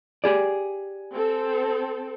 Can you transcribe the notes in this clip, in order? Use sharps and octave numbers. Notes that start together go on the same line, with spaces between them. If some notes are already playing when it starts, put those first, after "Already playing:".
G4 G#4 D5
C4 A4